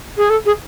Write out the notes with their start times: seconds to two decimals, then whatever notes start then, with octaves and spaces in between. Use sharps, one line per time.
0.18 G#4
0.30 A4
0.46 G#4